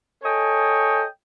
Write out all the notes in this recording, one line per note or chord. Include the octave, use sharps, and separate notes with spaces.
A4 C#5 D#5 G5 G#5